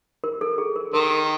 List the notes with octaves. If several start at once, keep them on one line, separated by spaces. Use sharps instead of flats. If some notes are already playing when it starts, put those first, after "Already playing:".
A#4
A4
G#4
A#4
D#3 A#4